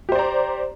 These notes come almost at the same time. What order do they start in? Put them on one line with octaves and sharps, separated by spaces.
G4 C5 D5 A#5